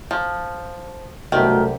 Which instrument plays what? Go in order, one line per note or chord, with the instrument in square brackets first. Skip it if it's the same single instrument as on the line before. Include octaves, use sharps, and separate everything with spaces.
[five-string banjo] F3
[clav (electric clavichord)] C2 F#2 G4 [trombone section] B2 A3 [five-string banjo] D#3